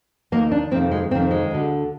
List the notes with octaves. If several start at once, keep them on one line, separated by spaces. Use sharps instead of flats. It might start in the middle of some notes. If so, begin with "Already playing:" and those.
D#2 D#3 A#3
D4
F2 C3 D#3 C4
G#3
F2 C3 D#3 C4
G#3
D2 D3